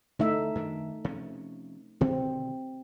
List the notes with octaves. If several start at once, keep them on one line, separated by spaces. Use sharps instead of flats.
D2 D3 A3 D#4 E5
F#2 D#3 D4
C3 F3 C#4
B2 D3 D#3 C4